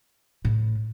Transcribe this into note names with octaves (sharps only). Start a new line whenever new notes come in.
A2